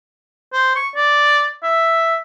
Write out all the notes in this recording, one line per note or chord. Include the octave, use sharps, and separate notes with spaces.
C5
C#6
D5
E5